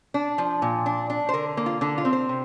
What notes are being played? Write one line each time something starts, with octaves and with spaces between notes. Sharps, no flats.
D4
F3
A#2
D4
D4
C5
D3 A#4
A#3
F4
D3 D4
F4
C4
C5
C3